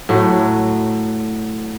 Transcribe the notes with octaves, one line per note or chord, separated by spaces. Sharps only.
A2 F#3 A3